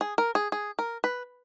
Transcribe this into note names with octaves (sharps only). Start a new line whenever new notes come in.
G#4
A#4
G#4
G#4
A#4
B4